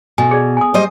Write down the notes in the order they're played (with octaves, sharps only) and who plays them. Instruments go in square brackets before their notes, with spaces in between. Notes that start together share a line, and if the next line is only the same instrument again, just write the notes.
[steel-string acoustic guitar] B2 [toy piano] A4 G#5
[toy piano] G#4 D5
G#5 D#6
[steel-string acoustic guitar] G3 C5 D#5